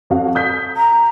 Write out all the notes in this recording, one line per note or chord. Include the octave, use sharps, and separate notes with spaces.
F2 F#4 F5
D#6 G6 B6
A#5